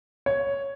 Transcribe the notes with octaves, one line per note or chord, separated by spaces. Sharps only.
C#5